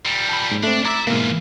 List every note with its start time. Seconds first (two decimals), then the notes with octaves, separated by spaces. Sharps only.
0.05 A#2 G3
0.29 A5 B5
0.51 G#2
0.63 A3 C4 D4
0.85 E4 E5 A#5 D6 A6
1.07 G#2 B2 E3 A#3 F4